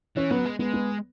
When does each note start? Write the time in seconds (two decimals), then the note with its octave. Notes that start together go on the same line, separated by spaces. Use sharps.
0.17 E3 C#4
0.30 F#3 B3
0.46 G#3
0.59 G#3 B3
0.73 B3